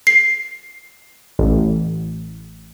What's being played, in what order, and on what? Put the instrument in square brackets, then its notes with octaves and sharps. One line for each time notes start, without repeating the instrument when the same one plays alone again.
[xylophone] C7
[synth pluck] A1